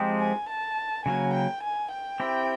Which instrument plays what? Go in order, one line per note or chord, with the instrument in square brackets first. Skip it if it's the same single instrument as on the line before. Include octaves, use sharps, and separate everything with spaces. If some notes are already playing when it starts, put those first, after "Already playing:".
Already playing: [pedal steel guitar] F3 G#3 C4 D#4 G4
[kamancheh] G#5
A5
[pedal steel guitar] C#3 F#3 A#3 [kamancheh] G#5
[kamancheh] G5
G#5
G5
[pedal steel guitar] C4 E4 G4